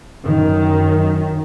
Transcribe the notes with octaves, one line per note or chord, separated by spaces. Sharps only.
F#2 D#3